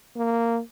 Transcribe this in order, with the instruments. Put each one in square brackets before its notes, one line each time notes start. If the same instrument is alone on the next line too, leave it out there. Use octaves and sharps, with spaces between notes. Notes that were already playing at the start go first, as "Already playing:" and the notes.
[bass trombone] A#3